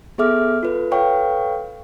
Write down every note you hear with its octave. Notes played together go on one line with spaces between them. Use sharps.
B3 G#4 A4 E5 D6 F6
F4 A4 B4
A4 B4 C#5 F5 G5 C#6